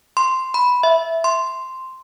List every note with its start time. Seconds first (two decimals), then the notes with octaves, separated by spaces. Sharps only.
0.17 C6
0.54 B5
0.83 E5
1.24 C6